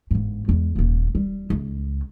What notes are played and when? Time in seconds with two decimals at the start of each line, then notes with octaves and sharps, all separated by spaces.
0.11 G1 G#2
0.48 E2 G#3
0.75 D#1 A#3
1.15 G3
1.50 C#2